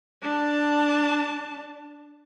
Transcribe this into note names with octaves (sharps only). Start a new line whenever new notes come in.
D4 A5